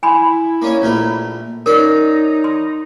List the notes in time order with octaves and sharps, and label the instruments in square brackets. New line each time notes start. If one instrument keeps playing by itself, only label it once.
[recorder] E4 [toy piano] G#5 B5 C6
[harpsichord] A#3 C#4 C#5
A#1 A3 A#4
[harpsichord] C#4 D5 F5 [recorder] D#4 [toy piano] A#4
[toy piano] C6